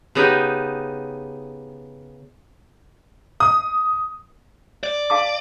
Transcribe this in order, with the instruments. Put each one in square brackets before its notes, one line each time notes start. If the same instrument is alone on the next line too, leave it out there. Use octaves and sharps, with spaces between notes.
[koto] C#3 B3 D#4 G4
[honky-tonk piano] D#6
[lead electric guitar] D5
[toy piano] F5 A5 D6